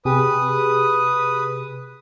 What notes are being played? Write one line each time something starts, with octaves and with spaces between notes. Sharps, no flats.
C3 G4 G#4 B4 D#6